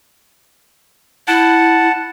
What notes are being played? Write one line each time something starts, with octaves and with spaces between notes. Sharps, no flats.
E4 F#5 A5